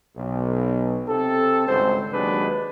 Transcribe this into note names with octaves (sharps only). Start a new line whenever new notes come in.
B1
C3 C4 A4
G#1 C#2 G2 C4 C5
D#2 F#3 G#3 D4 B4